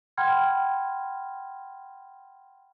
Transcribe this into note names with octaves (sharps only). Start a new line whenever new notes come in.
F#5 G5 B5 C6 F6 G#6